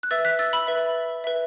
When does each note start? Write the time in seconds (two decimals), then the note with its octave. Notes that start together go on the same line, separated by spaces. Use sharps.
0.03 F#6
0.11 B4 E5 E6 A6
0.25 F#6 B6
0.39 E6 A6
0.53 B5 E6
0.67 B4 E5
1.24 B4 E5